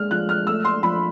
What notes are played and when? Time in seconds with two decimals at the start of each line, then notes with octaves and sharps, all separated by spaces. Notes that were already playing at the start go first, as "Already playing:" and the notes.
Already playing: G#3 F6
0.11 F3 F#6
0.29 F6
0.47 A3 E6
0.65 C6
0.83 F3 B5